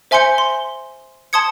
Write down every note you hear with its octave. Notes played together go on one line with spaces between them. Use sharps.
C5 E5 G#5 C6 G6 C#7
C6
A5 C6 D#6 G#6 C#7